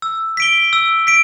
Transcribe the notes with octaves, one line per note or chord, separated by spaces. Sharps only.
E6
B6 D7 G7
E6
B6 D7